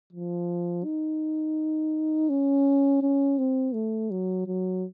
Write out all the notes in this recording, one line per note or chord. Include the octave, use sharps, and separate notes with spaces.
F3
D#4
C#4
C#4
C4
A3
F#3
F#3